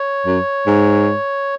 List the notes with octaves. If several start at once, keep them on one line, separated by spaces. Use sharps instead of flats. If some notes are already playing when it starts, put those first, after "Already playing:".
Already playing: C#5
F#2
G#2